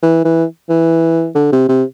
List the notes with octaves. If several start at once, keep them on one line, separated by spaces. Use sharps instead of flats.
E3
E3
E3
D3
C3
C3